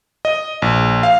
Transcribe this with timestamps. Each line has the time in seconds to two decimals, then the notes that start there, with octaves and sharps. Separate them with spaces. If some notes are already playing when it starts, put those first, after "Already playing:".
0.25 D#5
0.62 A#1
1.03 F5